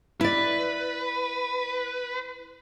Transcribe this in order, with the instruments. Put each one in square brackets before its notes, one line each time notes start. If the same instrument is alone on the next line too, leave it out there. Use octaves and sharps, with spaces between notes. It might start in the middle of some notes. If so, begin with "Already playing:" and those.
[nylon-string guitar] E4 D5 [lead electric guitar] B4